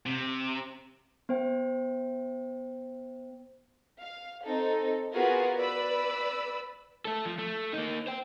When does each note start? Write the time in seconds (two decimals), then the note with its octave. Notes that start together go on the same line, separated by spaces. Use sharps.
0.06 C3
1.29 B3 C5 G5
4.00 F5
4.44 C4 D#4 A4
5.14 B3 F4 F#4 G#4 A#4 B4
5.57 B4 D5 B5 E6
7.05 A3 A4
7.25 F3
7.38 A3
7.73 A#3 D#4
8.07 C5 G5